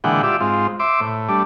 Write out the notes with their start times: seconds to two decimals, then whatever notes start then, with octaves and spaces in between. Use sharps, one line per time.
0.04 A#2 D3 E3 G#3 F#5 G5
0.23 F4 G4 D5 E5
0.40 G#2 C4 F4
0.80 C5 E5 D6
1.00 A2
1.29 G3 A3 D4